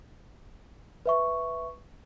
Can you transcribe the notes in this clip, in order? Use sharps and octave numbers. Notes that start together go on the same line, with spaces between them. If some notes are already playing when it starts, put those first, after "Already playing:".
B4 E5 C#6